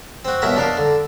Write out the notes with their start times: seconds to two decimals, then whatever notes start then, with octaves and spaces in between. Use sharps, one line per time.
0.25 C4 F#4
0.42 C2 B2 F#3 E4 A#4 A#5
0.56 D4 D#4 A#4 F5 D6
0.77 D3